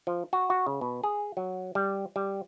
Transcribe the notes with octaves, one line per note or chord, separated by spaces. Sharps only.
F3
F#4
F#4
C#3
B2
G#4
F#3
G3
G3